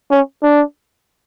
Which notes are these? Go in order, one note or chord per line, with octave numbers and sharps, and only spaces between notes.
C#4
D4